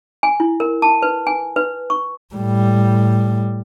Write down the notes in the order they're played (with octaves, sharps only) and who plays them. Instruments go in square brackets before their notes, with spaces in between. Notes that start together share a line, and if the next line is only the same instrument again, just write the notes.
[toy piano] G#5
E4
A#4
A5
B4
G#5
B4
C#6
[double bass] A2 G3